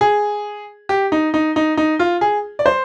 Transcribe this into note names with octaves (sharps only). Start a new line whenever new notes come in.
G#4
G4
D#4
D#4
D#4
D#4
F4
G#4
D5
C5